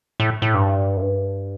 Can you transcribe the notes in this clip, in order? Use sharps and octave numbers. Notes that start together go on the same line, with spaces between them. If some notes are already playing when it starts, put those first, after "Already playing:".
A2
A2
G2
F#2
G2